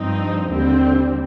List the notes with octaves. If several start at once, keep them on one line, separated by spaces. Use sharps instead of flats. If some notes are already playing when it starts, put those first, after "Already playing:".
Already playing: G2 F3 C4 D#4
D#2 D3 G3 C4